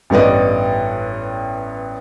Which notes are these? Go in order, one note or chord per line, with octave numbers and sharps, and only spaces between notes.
A1 G2 B3 D5 D#5